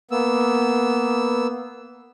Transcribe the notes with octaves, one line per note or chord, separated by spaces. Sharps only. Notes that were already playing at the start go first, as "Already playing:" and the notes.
A#3 B3 E6